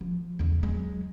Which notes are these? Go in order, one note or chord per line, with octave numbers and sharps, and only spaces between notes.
F3
E2 C#3
F#3 G#3